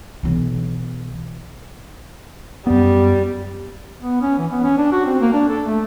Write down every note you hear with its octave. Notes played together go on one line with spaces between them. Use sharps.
B1 E3
F#2 G3 B3
B3
C#4
E3
B3
C#4
D4
F#4
C4
A#3
D4
A4
A3